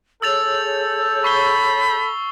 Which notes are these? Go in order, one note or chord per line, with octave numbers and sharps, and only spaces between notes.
G#4 A4 C#5 E6 G6 A6 F7
B5 C#6 C7 G7